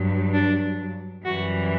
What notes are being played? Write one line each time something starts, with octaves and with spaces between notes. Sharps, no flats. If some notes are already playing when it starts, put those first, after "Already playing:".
Already playing: G2 F#3
D4
F#2 E3 G3 F#4